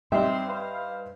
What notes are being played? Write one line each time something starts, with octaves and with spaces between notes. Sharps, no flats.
G2 C4 D#4 G4 E5 C6
B4 C5 F5